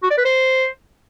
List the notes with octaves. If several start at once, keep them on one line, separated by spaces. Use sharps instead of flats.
F#4
D5
B4
C5